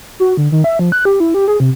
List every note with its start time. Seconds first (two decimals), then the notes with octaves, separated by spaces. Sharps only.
0.20 F#4
0.37 D3
0.52 D#3
0.64 E5
0.79 F3
0.92 F#6
1.05 G4
1.20 E4
1.34 G4
1.48 G#4
1.60 C3